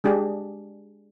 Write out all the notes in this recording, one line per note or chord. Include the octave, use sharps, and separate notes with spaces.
G#3 D4 G4 G#4